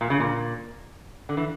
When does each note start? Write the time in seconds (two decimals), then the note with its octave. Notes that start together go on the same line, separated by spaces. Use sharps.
0.01 A#2
0.10 C#3
0.20 A#2
1.29 D3
1.37 E3